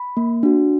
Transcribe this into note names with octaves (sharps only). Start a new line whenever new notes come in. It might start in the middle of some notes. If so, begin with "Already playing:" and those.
Already playing: B5
A#3
D4 F#4